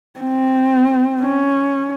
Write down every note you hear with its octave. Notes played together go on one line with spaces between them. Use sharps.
C4
C#4